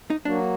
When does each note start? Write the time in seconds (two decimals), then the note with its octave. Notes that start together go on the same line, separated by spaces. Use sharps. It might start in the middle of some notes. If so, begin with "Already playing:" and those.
0.10 D#4
0.25 F#3 A#3 D4 F#4